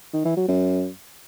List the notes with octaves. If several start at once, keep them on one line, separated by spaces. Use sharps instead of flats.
D#3
E3
F#3
F#2